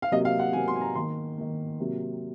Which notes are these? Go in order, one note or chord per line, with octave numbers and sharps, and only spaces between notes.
F5
C3 F#3 A#3 D#5
F5
F#5
C3 F#3 A#3 G#5
C6
G#5
A#5
D#3 A#3 C6
D#3 A#3
C3 F#3 A#3